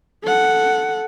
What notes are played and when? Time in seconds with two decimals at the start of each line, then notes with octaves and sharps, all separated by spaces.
0.24 A4 F#5